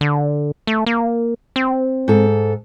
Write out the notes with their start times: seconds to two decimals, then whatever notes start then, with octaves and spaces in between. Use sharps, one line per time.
0.01 D3
0.67 A3
0.86 A#3
1.56 C4
2.08 G#2 A4